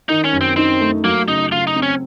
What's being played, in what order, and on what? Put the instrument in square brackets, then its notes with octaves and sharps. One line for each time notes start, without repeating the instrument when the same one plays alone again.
[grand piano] D#3 [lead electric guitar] D#4
[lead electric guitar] C#4
[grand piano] F#2
[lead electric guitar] C4
[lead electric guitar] C4 [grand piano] D#4
[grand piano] A3
[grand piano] F#3 [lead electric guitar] A#3
[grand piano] C#3 [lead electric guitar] D#4
[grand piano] C#3 [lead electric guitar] F4
[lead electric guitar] D#4
[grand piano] C4
[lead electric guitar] C#4